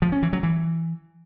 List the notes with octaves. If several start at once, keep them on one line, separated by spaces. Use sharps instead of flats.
F3
C#4
E3
F#3
E3